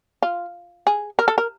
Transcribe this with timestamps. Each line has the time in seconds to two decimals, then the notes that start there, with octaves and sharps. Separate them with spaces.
0.22 F4
0.87 G#4
1.19 A#4
1.28 A4
1.38 A#4